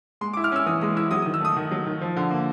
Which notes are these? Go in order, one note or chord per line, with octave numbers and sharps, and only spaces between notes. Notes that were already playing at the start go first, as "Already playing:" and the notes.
G#3 C6
D6
E4
F6
C#4 E6
E3 D#6
G#3 D#6
E4 E6
F#3 D#6
D#6
D#3
E6
A3 D#6
D#3
F#3
D#3
F3
D3
A#3